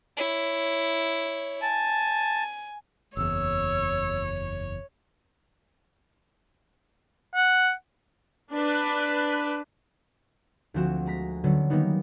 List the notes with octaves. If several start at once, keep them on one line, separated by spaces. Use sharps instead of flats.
E4 C#5
G#5 A5
F#1 E2 C#5 E6
F#5
D4 B4
D2 F3 C4 F#4 E7
G#3 A#5 B6
D3 F#3 B3 C#4
D#3 G3 A#3 B3 D#4